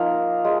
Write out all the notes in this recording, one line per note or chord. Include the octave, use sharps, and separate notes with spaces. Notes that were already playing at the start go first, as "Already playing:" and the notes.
Already playing: F3 A#3 D#4 F4 F5
G#3